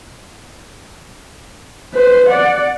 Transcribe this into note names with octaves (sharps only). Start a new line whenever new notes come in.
B4 C5
D5 F#5